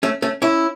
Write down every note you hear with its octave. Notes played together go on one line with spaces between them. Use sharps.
A3 C#4
A3 C#4
C#4 E4